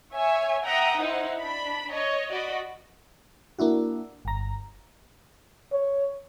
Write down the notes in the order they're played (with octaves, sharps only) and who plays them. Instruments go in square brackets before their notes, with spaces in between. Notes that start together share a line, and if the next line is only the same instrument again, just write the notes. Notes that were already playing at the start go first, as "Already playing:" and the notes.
[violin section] C#5 E5 G#5
E5 F#5 G5 A#5 D#6
D#4 E4 C5 F#5
D4 B5
C#5 D#5
F#4 D5 D#5 B5
[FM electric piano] A#3 D4 E4 F#4
G1 A#5
[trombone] C#5